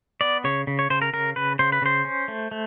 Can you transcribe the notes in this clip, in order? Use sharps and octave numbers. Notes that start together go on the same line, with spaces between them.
B3 D5
C#3 C#5
C#3
C#5
C#3 C5
A#4
C#3 A#4
C#3 B4
C#3 C5
B4
C#3 C5
C#4
A3
A3